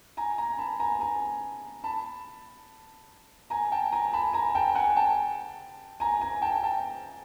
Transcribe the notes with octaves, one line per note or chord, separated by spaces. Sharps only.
G#5 A#5
G#5 A#5
A5 B5
G#5 A#5
G#5 A#5
A5 B5
G#5 A#5
G5 A5
G#5 A#5
A5 B5
G#5 A#5
G5 A5
F#5 G#5
G5 A5
G#5 A#5
G#5 A#5
G5 A5
G5 A5